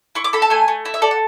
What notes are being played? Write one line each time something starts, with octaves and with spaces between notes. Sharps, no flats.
E4 C#6
D6
A4 B5
A5
A3 G#5
A3
E4
E5
A4 D5
F#5